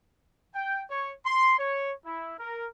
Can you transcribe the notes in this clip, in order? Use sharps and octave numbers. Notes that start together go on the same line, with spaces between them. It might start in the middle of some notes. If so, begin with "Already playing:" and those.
G5
C#5
C6
C#5
E4
A#4